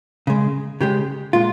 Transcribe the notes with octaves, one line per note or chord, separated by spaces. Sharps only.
C#3 G#3
C#3 G#3 G4
A#2 G#3 F4